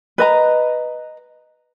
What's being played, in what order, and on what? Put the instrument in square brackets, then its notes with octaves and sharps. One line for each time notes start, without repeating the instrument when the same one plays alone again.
[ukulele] B4 D#5 A#5